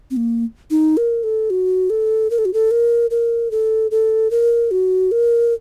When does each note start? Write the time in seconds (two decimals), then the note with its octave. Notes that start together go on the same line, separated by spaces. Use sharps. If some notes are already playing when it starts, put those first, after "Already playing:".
0.11 C4
0.17 A#3
0.71 D#4
0.97 A#4
1.23 A4
1.50 F#4
1.90 A4
2.30 A#4
2.38 A4
2.45 F#4
2.54 A4
2.71 A#4
3.11 A#4
3.51 A4
3.91 A4
4.31 A#4
4.71 F#4
5.12 A#4